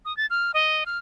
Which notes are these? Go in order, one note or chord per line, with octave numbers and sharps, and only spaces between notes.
D#6
A6
F6
D#5
F6